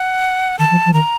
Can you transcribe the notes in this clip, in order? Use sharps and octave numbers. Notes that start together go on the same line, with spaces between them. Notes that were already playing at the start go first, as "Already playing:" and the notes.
Already playing: F#5
D#3 A5
F3
F3
D#3 A#5